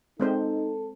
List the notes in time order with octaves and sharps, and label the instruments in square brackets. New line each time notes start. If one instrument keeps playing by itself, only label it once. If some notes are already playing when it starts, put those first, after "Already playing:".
[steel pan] G#3 C4 C5 [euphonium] D#4 [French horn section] A4